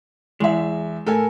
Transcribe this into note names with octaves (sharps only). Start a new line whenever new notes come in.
E2 G#3 E5
A2 A4 A#4 G#5